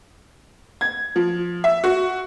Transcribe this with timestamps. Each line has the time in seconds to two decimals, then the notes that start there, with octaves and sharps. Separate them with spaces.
0.81 G#6
1.16 F3
1.64 E5
1.84 F#4